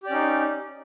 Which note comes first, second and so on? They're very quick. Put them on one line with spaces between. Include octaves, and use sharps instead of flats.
G4 D5 C#4 D#4